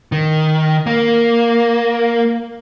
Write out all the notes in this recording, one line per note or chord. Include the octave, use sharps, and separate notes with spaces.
D#3
A#3